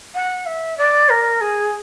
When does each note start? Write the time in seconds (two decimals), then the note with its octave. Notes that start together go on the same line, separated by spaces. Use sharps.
0.15 F#5
0.46 E5
0.77 D5
1.09 A#4
1.41 G#4